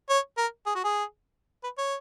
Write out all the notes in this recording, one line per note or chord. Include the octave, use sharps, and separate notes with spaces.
C#5
A#4
G#4
F#4
G#4
B4
C#5